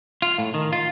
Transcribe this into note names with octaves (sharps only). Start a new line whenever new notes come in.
F4
A2
D#3
F4